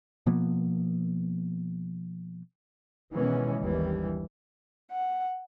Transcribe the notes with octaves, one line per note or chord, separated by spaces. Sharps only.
B2 F3 A#3 B3
B2 D#3 E3 G#3 B3 C#4
G1 D#2 E3 G3
F#5